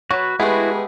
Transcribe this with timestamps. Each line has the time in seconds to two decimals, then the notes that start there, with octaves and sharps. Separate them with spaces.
0.11 F#3 F#4 B4 C#5
0.40 G#3 A3 B3 E4 F#4 G4 B4